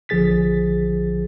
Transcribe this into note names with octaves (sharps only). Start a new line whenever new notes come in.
A#1 D3 F3 G#4 A6 B6